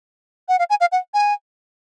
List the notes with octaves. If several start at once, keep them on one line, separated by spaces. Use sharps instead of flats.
F#5
F5
G#5
F5
F#5
G#5